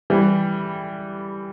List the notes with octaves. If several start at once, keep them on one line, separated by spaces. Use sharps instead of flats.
E3 G3